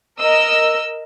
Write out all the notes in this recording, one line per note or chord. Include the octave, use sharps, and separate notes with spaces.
A#4 D#5 E6